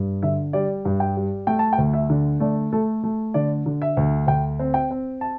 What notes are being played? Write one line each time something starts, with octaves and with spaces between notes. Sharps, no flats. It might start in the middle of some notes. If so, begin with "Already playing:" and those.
Already playing: G2
D3 E5
G3 D5
G2
G5
G3
A3 G5
A5
G5
D2
E5
D3
A3 D5
A3 A4
A3
D3 D5
D3
E5
D2
D2 G5
C4
G5
C4
A5